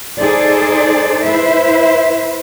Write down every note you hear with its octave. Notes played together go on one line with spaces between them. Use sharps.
D#4 G#4 A4 C5 D5
E4 B4 C5 E5